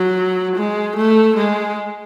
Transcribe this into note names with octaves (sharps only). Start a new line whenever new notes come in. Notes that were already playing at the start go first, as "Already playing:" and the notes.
Already playing: F#3
G#3
A3
G#3